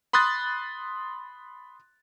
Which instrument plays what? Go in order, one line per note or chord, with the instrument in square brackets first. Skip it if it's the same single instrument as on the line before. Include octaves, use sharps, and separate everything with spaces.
[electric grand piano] B5 C6 D#6 F#6 A6